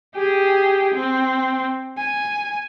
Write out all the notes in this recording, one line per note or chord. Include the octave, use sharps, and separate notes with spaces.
G4 G#4
C4
G#5